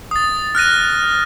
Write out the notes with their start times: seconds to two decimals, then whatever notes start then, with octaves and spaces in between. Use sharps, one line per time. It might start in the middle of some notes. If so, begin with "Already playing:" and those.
0.11 D#6 A6
0.55 F6 F#6 A#6 D#7